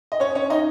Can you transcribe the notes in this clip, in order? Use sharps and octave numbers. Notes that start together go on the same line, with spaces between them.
D#5
C#4 C#5
C#4 C#5
D#4 D#5